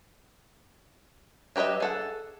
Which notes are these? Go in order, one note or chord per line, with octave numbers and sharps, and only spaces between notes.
F#3 G4 B4 D#5 E5
G#4 A4 F#5